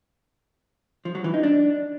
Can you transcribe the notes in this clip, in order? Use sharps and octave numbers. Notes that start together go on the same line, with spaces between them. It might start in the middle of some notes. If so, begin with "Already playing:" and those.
F3
F#3
E3
D#4
D4